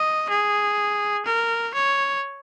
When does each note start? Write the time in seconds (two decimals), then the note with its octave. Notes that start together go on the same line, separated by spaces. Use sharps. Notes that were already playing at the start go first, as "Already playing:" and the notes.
Already playing: D#5
0.30 G#4
1.26 A#4
1.75 C#5